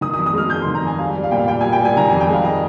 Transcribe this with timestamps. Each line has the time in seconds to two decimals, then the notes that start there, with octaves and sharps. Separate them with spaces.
0.01 D#3 D#6
0.14 D#6
0.18 F2
0.26 D#6
0.33 G#3 F6
0.50 F2 G6
0.62 D#3 C6
0.75 A#5
0.83 F2 G#5
0.99 G3 F5
1.15 G3
1.23 F5
1.31 A#2 G5
1.39 F5
1.48 A#2 G5
1.61 G3 G#5
1.72 G5
1.81 G3 G#5
1.97 D#3 A#5
2.09 F2 G#5
2.20 G5
2.29 G#3 F5
2.45 D#5